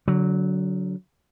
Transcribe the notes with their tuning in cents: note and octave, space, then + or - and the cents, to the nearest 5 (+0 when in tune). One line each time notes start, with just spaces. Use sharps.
D3 -30 F#3 +0